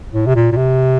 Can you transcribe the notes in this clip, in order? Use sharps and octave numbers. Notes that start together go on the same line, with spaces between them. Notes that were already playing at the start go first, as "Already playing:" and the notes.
A2
C3
A#2
A#2
C3